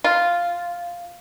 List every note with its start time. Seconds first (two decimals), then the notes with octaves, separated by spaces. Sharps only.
0.04 F4